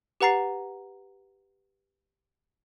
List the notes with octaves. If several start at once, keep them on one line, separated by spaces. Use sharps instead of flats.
G4 B4 F#5 A#5 A6 C7